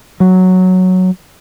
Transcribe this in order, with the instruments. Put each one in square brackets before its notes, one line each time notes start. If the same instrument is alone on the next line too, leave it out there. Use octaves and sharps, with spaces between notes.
[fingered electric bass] F#3